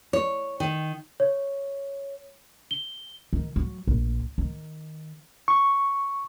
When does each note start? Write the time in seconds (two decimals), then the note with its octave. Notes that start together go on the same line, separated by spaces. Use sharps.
0.13 C#5
0.60 D#3
1.20 C#5
2.71 G7
3.33 D#3
3.56 F#3
3.87 A#1
4.38 D#3
5.48 C#6